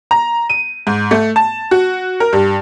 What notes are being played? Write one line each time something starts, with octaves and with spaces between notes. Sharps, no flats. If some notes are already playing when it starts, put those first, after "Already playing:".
A#5
D#7
G#2
A3
A5
F#4
A#4
G2